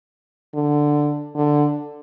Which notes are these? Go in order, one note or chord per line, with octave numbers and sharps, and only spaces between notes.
D3
D3